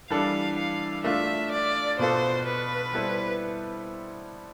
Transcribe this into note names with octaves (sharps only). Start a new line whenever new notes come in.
E3 G3 D4 A4 F5
F5
A3 D4 F4 E5
D5
B2 B3 F4 A4 C5
B4
G3 B3 E4 A4 C5